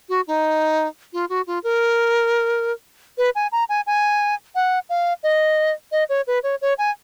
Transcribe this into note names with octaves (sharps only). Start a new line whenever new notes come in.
F#4
D#4
F4
F#4
F4
A#4
B4
G#5
A#5
G#5
G#5
F#5
F5
D#5
D#5
C#5
B4
C#5
C#5
G#5